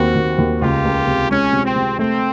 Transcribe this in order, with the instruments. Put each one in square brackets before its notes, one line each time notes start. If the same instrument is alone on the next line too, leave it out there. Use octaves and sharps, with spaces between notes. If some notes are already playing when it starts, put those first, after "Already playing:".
Already playing: [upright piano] D#2 C4 [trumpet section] F#4
[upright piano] D#2
D#2
[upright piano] C#2 [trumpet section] F4 G4
[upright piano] C#2
C3
[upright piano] G#3 [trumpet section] C#4
[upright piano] C3
[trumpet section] C4
[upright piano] C3
[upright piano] A3 [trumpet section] C4